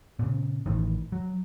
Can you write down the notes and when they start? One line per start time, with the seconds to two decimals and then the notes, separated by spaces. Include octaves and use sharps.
0.19 A#2 C#3
0.66 A1 A2 D#3 E3
1.12 F#3